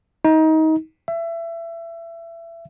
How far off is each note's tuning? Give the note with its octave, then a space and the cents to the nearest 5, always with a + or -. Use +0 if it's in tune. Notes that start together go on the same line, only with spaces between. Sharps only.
D#4 +25
E5 +25